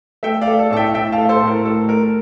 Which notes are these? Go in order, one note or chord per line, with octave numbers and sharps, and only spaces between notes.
A3 E5 G5
D5 F5
A3
A4
A2 A5
E5 G5
A2 E5 G5
F5 A5
A3
A4 C5
A2
A#4
A3 A4
A3 A#4